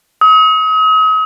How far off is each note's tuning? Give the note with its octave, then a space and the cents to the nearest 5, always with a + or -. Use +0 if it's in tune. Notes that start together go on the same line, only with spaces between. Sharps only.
D#6 +40